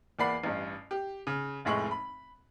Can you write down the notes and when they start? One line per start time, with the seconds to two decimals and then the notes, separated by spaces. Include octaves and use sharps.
0.19 E2 A#3 D5 F#5 B5 C7
0.44 A1 G2
0.91 G4
1.27 C#3
1.65 F1 A2 G#3 C#6 F#7
1.91 B5